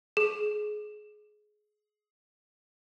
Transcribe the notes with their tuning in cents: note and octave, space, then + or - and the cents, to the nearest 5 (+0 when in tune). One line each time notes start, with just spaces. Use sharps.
G#4 +20